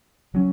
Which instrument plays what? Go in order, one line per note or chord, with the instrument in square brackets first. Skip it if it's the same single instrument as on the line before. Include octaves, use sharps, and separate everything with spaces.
[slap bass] C#3 F#3 C#4